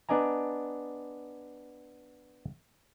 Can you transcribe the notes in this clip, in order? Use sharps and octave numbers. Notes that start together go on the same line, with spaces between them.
B3 D4 D5 D#5 G#5 A#5